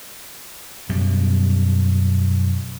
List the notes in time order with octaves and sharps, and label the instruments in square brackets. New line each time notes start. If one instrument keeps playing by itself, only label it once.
[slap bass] F#2 B2 G3